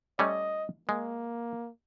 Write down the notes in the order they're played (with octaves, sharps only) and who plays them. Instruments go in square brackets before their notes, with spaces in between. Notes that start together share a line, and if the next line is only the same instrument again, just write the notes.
[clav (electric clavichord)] G3 A3 C#4 [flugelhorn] D#5
[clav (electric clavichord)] G#3 [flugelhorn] A#3